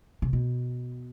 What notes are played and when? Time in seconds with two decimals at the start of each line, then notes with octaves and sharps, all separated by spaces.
0.22 C3
0.33 B2